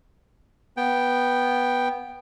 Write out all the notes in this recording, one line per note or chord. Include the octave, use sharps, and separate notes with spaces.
B3 G5